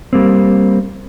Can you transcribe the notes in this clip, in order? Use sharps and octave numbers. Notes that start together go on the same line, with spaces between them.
G3 A#3 C4